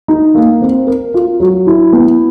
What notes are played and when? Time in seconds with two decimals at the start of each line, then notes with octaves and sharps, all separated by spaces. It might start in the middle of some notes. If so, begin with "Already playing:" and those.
0.08 D#4
0.35 A#3
0.61 C4
0.87 A#4
1.14 F4
1.40 F#3
1.67 E4
1.93 B3